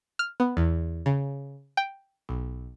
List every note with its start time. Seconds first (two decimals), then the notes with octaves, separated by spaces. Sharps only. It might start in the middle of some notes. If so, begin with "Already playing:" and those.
0.19 F6
0.40 B3
0.57 E2
1.06 C#3
1.77 G5
2.29 B1